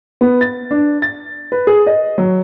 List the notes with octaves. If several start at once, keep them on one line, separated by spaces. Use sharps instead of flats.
B3
A6
D4
A6
B4
G#4
D#5
F#3